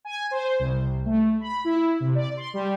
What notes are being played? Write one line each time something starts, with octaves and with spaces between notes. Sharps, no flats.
G#5
C5
C2
A3
B5
E4
C3
D5
C6
G3